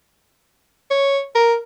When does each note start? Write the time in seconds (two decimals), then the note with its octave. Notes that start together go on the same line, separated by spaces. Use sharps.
0.91 C#5
1.35 A#4